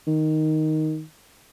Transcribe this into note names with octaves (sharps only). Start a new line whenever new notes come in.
D#3